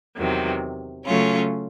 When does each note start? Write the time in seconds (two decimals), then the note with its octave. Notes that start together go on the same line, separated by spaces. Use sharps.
0.16 E2 C3 D#3 F#3
1.05 C#3 F#3 A3 C#4 F4